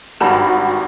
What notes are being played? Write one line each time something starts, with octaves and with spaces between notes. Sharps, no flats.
G#1 G2 F#4 A#5 B5 E7